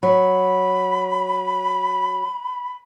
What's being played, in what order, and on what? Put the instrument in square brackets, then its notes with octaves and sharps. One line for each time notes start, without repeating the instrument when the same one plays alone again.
[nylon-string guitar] F#3 [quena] B5